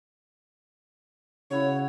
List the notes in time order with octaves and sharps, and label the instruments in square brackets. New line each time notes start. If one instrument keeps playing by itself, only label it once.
[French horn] C#3 [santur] E4 F#4 C#6 [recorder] C#5